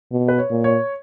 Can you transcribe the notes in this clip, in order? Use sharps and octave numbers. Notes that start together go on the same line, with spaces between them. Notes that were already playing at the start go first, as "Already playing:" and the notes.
B2
B4
C#5
A#2
C#5